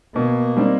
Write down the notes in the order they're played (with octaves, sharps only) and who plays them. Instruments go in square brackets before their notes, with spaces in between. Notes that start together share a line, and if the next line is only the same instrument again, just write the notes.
[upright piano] B2 [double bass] A#3
[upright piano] G3 C4 D#4